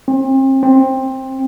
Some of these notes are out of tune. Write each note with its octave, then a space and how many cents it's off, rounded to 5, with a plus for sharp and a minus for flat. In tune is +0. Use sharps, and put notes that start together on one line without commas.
C4 +35
C4 +15